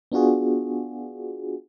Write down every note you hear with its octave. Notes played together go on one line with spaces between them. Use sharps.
B3 D4 F4 F#4 G#4